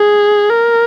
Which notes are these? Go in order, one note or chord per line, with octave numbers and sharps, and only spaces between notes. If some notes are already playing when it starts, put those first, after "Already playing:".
Already playing: G#4
A#4